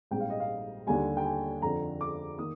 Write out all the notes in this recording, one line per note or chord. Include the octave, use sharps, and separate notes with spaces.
A#1 G#2 G3 C4 G5
F5
D#5
F5
D#2 D3 G3 G#5
G5
G#5
F2 D3 F3 C4 A#5
D6
D#3 A#3 D#6